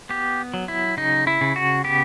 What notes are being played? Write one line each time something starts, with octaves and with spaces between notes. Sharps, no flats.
B3 G4
F#3
E4
C#3 D#4
E4
C#3
F#4
B3 G4